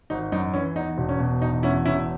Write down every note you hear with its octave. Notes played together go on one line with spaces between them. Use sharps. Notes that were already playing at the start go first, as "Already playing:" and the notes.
G#1 D#4
F#2 D#4
E3 C#4
E2 D#4
E1
C#4
B2
E1 D#4
E2 C#4 E4
E1 C#4 E4